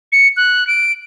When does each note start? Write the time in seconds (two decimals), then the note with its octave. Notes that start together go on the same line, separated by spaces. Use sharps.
0.12 C#7
0.37 F#6
0.67 D7